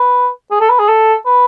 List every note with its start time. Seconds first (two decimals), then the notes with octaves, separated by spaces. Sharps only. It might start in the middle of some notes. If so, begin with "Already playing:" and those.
Already playing: B4
0.51 G#4
0.60 A4
0.70 B4
0.79 G#4
0.89 A4
1.26 B4